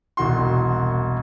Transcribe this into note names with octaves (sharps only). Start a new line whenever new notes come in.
E1 C2 F#4 C6